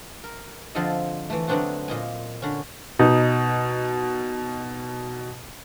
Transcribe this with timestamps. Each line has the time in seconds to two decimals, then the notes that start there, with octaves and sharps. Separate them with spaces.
0.24 A#4
0.75 D3 F3 C4 F4 A4 D#5
1.30 E3 A3
1.48 D3 F#3 B3 C4 D4 F#4
1.88 A#2 D#5 G#5
2.42 D3 C#4
2.99 B2 D#4